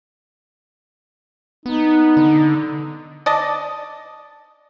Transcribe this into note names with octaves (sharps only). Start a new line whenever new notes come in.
B3 D#4
D3
D5 D#5 A5